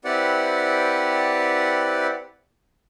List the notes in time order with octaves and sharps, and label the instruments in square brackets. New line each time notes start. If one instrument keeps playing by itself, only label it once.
[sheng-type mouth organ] C4 E4 G4 B4 D5 F#5